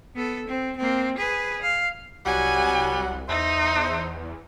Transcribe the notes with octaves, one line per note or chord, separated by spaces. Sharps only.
B3 A4
C4
A#3 C4
G#4 B4
F5
C2 F#3 G3 F#5 G#5
E2 D#4 C5 E5